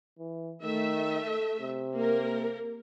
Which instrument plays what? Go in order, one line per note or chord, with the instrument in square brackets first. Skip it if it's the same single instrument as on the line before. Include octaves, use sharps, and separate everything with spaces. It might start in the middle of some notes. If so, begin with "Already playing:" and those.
[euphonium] E3
[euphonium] D#3 [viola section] A3 E5
[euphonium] A4
C3
[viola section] A#3 A#4